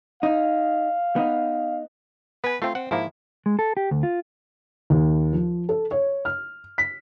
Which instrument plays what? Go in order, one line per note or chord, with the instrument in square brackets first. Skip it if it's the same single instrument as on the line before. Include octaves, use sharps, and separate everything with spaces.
[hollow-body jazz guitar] D#4 [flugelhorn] F5
[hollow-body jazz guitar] B3 D#4
[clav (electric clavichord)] B3 G#5 [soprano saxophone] B4
[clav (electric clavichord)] A3 C4 [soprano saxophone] F4
[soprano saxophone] C4 [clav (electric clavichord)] F#5
[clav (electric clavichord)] G#2 F3 A#3 [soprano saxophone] E4
[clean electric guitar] G#3
A4
G4
D2
F4
[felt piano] D#2
F3
A4
C#5
F6
B6